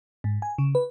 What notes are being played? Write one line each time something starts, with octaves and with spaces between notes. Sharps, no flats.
G#2
G#5
C#3
B4